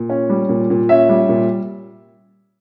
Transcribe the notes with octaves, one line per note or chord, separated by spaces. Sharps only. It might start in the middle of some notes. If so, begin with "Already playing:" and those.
Already playing: A#2
C#4
G3
A#2
A#2
C#4 E5
G3
A#2